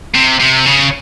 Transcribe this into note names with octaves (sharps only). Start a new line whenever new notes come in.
C3
C3
C#3